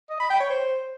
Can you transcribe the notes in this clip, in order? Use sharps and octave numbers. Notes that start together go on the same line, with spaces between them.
D#5
B5
G5
C#5
C5